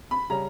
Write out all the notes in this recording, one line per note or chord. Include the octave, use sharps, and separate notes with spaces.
B5
C#3 G3 C#4 A#5